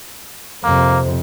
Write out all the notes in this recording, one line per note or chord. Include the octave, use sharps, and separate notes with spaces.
F2 C3 A#3